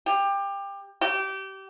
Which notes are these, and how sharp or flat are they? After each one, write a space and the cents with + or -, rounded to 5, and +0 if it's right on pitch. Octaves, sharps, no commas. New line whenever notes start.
G4 +20
G4 -25